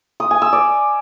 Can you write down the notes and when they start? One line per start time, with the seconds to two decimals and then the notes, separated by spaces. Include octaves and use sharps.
0.20 D#6
0.31 G#5
0.42 E6
0.53 D5